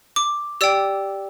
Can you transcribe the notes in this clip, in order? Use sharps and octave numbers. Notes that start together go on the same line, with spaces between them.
D6
G4 D5 G5 E6